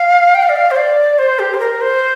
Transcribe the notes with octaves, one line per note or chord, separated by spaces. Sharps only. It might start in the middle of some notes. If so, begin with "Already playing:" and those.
Already playing: F5
G5
F5
D5
F5
C5
D5
C5
G4
C5
A#4
C5